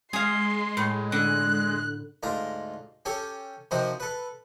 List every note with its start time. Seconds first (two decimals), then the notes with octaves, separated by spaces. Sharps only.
0.13 G#3 G#4 F5 C6
0.77 A2
1.12 D3 F#6
2.23 D2 G#2 F4 A#5
3.05 C#4 G4 A4 C#5
3.71 C3 D#3 F3 F#4 C5
4.00 A4 B4